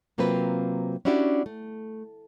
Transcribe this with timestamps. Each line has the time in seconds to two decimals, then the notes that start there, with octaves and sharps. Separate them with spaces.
0.18 C3 F#3 A#3 C4 F4 B4
1.05 C#4 D4 E4 F#4 G4 D5
1.46 A3